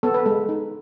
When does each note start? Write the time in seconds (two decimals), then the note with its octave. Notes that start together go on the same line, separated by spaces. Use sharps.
0.03 B3 A4
0.14 B4
0.26 G#3 A4
0.49 D#4